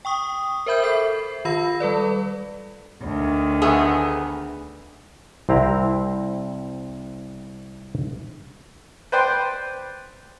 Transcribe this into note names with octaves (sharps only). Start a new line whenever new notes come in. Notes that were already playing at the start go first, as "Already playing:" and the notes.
G5 C#6 D#6
A#4 C5 E5 B5 G6
A4 E5 C7
D#3 F4 B5 E6 A#6
G3 A4 B4 D5
D2 D#3
A3 B3 G#4
C2 C4 E4 A#5
B4 C5 D5 G5 C6